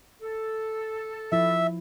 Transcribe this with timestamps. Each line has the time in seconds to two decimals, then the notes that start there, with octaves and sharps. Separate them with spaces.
0.21 A4
1.32 F3 E4 E5